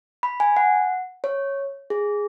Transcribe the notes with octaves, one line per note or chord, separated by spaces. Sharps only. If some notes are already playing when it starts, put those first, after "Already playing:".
B5
G#5
F#5
C#5
G#4